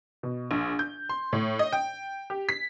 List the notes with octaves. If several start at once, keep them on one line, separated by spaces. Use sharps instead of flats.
B2
A#1
G6
C6
A2
D#5
G5
G4
B6